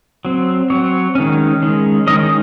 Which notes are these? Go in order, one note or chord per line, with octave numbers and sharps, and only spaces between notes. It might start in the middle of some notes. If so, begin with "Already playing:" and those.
F#3 C4
F#3 C4 C#5
D#3 G#3 C#4
D#3 G#3 C#4
D#3 G#3 C#4 D#5